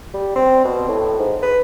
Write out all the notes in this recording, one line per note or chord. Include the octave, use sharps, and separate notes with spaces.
G3
C4
B2
A2
G#2
B4